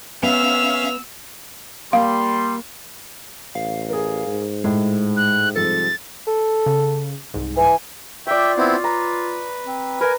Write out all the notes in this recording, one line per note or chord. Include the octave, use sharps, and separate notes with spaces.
B3 C#4 E5 F5 E6 F7
G3 A#3 F5 C6
A1 F5
G#4 A#4
G#2
A2 G#3
F#6
C3 F3 G3 A4 A6
A4
C#3
C2 G#2
E3 G#5
F4 C#5 D5 E5 G5
B3 C4 E4
B4 A#5
C4
A#4 B4 G#5 A#5